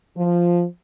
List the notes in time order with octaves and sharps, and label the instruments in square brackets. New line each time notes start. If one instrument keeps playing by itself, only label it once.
[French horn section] F3